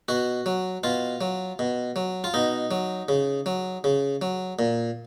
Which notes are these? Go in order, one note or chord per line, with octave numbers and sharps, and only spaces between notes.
B2 F#4
F#3
B2 F4
F#3
B2
F#3
F4
B2 D#4
F#3
C#3
F#3
C#3
F#3
A#2